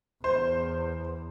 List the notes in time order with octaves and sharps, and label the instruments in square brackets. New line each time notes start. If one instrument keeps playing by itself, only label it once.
[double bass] E2 [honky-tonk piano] C5